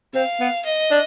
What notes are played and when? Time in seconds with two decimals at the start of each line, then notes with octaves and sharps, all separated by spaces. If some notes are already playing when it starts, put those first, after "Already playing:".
0.15 C4 F5
0.40 B3
0.65 D#5
0.91 D4